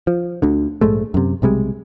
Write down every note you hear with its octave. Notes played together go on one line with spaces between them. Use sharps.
F3
D2 D3
A#1 G#2 G#3 A3
F#2 C3
B1 C3 G3 G#3